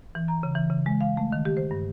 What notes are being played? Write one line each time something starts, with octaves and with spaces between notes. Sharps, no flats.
E3
A#5
C#3
E3
C#3
G#3
F5
A3
D#3
G4
C5
G2